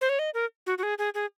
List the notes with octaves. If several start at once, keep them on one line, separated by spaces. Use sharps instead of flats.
C5
C#5
D#5
A#4
F#4
F#4
G#4
G#4
G#4